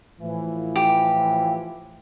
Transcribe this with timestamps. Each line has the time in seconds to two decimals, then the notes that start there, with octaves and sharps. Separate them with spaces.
0.20 A2 E3 F3
0.76 G4